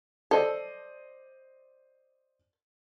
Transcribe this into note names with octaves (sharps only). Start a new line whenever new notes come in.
A4 C5 D5 D#5